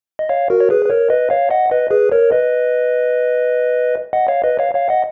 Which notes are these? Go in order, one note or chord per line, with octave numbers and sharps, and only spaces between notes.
D#5
C#5 F5
F#4 A#4
C#5
G#4 B4
B4
A#4 C#5
B4 D#5
C#5 F5
D#5 F#5
B4 D#5
G#4 B4
A#4 C#5
B4 D#5
D#5 F#5
C#5 F5
B4 D#5
C#5 F5
C#5 F5
D#5 F#5